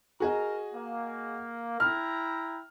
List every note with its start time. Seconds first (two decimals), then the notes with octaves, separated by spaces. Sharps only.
0.20 F#4 G#4 A#4 D#5 A#5
0.74 A#3
1.80 E4 G5 A#5 F6